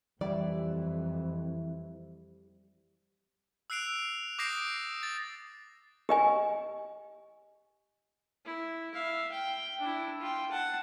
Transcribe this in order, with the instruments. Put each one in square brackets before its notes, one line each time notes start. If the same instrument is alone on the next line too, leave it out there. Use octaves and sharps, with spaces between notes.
[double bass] F2 [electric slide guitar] E3 E4 [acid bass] G3 [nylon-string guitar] D5
[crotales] E6 F#6 C7 D7 F7
D6 D#6 G6 A#6 C7 D7
A6
[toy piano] G4 D#5 G#5
[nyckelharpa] E4
E5 F5
G5
D4 E4
F4 G5
F#5 A5